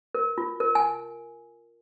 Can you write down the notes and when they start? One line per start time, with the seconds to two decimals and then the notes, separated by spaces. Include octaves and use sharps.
0.15 A#4
0.38 F4
0.60 A#4
0.75 G#5